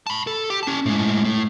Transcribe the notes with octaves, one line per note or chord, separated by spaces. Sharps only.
A5 B5
A4
G4
C#4 A5
A2 G#3
A2